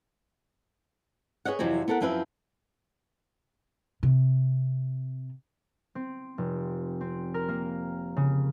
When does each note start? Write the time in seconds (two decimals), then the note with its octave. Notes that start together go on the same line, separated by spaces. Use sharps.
1.45 G#4 B4 C#5 D#5 F#5
1.59 F2 C3 E3 F#3 C4
1.88 B3 C4 A4 A#4 F#5
2.00 F#2 F3 C4 E4 B4 E5
4.03 C3
5.95 C4
6.38 F1
7.01 C4
7.34 A#4
7.49 A#3
8.16 C#3